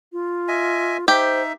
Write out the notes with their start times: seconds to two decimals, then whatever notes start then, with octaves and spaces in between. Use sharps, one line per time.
0.13 F4
0.48 D#5 E5 G#5
1.08 D#4 G4 C5 E5